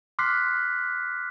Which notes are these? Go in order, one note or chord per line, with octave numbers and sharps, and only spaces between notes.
C6 D6 F6 F#6 B6 C7